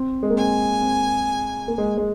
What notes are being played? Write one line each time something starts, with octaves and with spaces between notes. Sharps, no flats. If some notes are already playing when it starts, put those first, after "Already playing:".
Already playing: C4
G#3
A#3
C4 G#5
C4
A#3
G#3
G#3